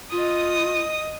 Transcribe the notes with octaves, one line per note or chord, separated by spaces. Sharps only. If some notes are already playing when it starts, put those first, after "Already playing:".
F4 D#5 D#6